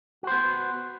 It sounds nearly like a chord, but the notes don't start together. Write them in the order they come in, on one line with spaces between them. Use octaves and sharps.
F#4 C5 B3